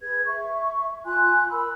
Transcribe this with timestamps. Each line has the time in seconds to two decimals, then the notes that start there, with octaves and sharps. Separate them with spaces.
0.01 G#4 B4 G#6
0.24 E5 C#6
1.05 F4 G#5 C6 F#6
1.51 A#4 B5 E6